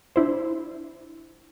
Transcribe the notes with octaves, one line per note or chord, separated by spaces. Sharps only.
D4 E4 C5